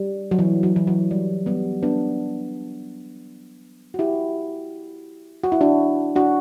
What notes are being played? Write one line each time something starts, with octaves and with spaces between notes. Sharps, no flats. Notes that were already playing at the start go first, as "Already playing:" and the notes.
Already playing: G3
F#3
E3
F#3
E3
F#3
G3
G3 B3
B3 D4
F#4
E4 G4
F#4
E4
D4 F#4
D4 F#4